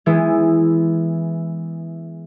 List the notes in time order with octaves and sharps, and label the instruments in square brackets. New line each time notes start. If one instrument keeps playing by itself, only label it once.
[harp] E3 G#3 B3 E4